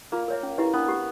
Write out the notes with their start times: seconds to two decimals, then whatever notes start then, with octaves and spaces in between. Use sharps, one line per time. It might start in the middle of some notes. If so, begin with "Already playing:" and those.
0.12 A#3 F4
0.28 A#4 C#5 E5
0.43 C#4
0.58 E4 G4 B4 E5
0.73 B3 D4
0.88 G4 A#4